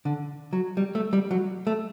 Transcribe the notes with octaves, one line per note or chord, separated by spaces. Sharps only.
D3
F#3
G3
A3
G3
F#3
A3